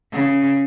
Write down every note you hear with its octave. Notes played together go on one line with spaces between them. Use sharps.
C#3